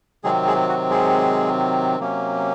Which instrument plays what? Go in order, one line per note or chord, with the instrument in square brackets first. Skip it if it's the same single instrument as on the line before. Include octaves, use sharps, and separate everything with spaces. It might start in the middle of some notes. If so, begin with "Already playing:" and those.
[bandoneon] C3 D#3 F#3 G#3 C4 G#4
G#3 G#4
F#4
G#3 G#4
C3 F#3 A#3 C#4